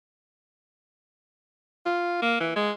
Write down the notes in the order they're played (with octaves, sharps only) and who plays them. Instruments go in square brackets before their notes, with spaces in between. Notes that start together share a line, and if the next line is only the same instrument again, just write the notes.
[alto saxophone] F4
A#3
E3
G#3